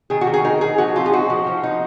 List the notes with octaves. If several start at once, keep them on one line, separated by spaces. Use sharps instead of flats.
D#3 G#4
F#4
D#3
G#4
D#4 A#4
D#4 G#4
F3 F#4
C4 F4
G#4
D#4 F#4
F3
F3
D#4